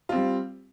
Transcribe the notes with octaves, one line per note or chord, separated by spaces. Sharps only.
G3 C4 F4